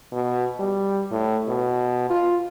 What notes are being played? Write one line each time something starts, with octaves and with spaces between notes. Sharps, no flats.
B2
G3
A2
B2
F4